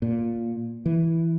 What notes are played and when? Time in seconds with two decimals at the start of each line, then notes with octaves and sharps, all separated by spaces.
0.02 A#2
0.86 E3